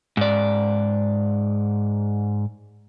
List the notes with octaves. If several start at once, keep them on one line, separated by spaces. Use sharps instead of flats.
G#2 D5